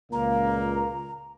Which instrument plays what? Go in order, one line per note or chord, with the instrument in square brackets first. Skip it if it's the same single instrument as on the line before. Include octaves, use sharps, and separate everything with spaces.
[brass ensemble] C#2 A#2 A#3 [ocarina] A#5